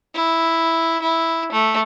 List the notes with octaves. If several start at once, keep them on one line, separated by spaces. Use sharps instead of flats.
E4
E4
A3